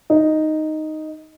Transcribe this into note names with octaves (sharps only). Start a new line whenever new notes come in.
D#4